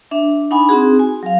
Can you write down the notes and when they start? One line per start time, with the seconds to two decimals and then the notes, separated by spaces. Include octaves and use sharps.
0.11 D4 E5
0.51 D4 D#4 F#5 G#5 B5
0.69 C4 D#4 F#4 G#4
0.99 G#5
1.23 F#3 F5